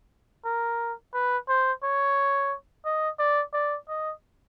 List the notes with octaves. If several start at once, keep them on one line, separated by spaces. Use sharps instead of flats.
A#4
B4
C5
C#5
D#5
D5
D5
D#5